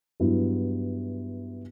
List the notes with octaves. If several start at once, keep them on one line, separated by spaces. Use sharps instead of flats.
G2 F#3 B3 E4